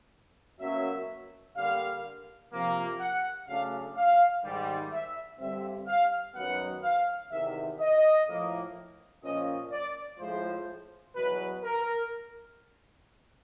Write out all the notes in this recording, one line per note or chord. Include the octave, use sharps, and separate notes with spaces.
B2 F#3 A#3 C#4 E5
D3 G3 A#3 F5
C3 F3 A#3
F#5
C#3 F#3 A3 D4 F5
F5
G#2 D#3 G3
E5
G2 D3 G3 C4 E5
F5
F#2 D#3 F#3 B3 F#5
F5
E2 C3 D#3 E5
D#5
A2 F3 A#3
A#2 F3 A#3 C#4 D#5
D5
A2 F3 G#3 C5
E2 B2 F#3 B4
A#4